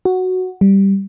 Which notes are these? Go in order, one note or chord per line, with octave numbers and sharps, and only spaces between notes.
F#4
G3